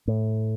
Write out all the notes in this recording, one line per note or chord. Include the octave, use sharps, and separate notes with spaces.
A2